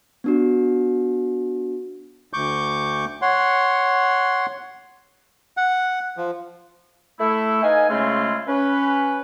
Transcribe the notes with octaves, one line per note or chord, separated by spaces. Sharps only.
B3 D4 F#4
D2 C#6 D6 G6
C#5 F#5 C6
F#5
F3
A3 E4
D#4 B4 D#5 F5 G#5
C#3 G#3 A3 C4 E4 F4
C#4 B4